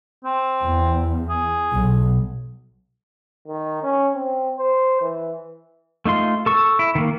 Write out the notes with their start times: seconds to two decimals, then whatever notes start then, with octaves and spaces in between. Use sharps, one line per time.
0.25 C4
0.65 E2
1.30 G#4
1.74 B1
3.48 D#3
3.83 C#4
4.14 C4
4.58 C5
5.02 E3
6.05 A3 D#4 F4 C6
6.46 A4 C#6 E6
6.79 E4
6.95 D#3 A#3